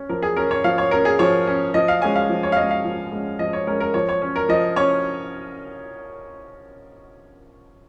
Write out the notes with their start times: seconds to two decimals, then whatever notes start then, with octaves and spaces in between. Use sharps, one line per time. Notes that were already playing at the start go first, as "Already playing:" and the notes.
Already playing: C#4
0.09 F3 A#4
0.22 G#4
0.36 C#4 A#4
0.51 C#5
0.64 F3 F5
0.78 C#5
0.91 C#4 A#4
1.05 G#4
1.19 F3 C#5
1.47 C#4
1.74 F3 D#5
1.88 F5
2.01 G#3 C#4 G#5
2.16 F5
2.29 F3
2.43 C#5
2.52 F5
2.57 G#3 C#4 D#5
2.71 F5
2.84 F3
3.12 G#3 C#4
3.39 F3 D#5
3.53 C#5
3.67 G#3 C#4 A#4
3.80 A#4
3.94 F3 C#5
4.09 C#5
4.22 C#4
4.36 A#4
4.49 F3 D#5
4.76 C#4 C#5